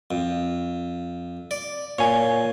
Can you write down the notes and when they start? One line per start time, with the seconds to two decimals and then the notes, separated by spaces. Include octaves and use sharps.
0.11 F2
1.51 D5
1.99 A#2 C#5 G#5